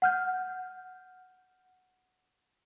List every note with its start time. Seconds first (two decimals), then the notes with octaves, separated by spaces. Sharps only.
0.02 F#5 F6 G6